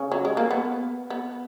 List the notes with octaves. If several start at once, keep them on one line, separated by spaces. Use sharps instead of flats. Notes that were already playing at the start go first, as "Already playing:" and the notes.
Already playing: C#3 C#4
F#3
G#3
A#3
B3
B3